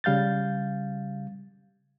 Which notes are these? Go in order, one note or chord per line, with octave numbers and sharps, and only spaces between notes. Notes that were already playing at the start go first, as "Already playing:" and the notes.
C#3 G3 F5 G6 A6